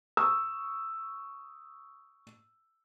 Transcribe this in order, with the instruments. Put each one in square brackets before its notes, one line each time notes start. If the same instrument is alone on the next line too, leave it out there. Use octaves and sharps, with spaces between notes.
[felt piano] C#6 D#6 E6